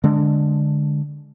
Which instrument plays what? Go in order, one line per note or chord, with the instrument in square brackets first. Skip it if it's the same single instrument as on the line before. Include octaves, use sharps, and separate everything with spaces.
[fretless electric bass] D3 G#3 D4